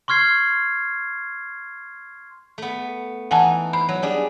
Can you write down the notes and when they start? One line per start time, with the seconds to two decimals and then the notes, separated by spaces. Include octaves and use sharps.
0.08 C6 C#6 F6 G#6 C7
2.58 A3 B3
3.31 E3 D#4 F#5 G#5 A5
3.73 C5 B5
3.89 F#3
4.03 G3 D4 G#4